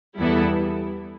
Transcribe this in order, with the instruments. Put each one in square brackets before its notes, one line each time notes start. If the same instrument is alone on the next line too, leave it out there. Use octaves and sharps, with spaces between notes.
[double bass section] E2 [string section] E3 G3 B3 E4 A4